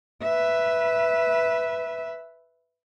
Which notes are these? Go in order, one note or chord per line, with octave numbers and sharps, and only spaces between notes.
B4 E5